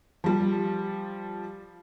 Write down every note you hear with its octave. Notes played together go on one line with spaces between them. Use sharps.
F3 G3